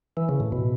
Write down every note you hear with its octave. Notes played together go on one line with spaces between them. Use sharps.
E3
C#3
A2
B2